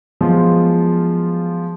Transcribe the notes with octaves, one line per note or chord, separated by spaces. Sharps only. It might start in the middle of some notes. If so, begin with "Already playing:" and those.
F3 F#3 G#3 B3 F4